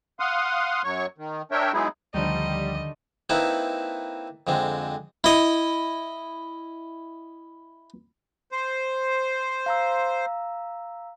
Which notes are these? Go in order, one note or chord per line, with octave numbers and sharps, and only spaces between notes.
F5 F#5 C6 D#6
F#2 F#3 C#5 C#6
D#3
D4 A#4 C#5 E5 G5
F#3 G#3 B3 D#4 E4 G#4
D2 D3 D#3 F3 G3 D#5
A#3 C4 D#4 E4 A4 B4
F2 D3 G#3 C4
E4 D#5
C5
F5 A#5 E6